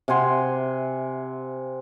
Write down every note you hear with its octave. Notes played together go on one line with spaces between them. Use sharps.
C3 F#5 G#5 C6